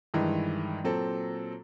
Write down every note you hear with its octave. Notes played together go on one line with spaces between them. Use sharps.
G2 D#3 E3 G#3
A#2 F#3 C4 A4